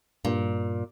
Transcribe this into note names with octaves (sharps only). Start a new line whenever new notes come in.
G2 A#2